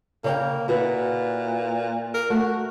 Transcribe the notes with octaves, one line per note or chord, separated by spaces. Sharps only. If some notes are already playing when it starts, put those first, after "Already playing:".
C#3 A#3 D5 G5
A#2 E4 F#4 B4
A#4
A3 F#4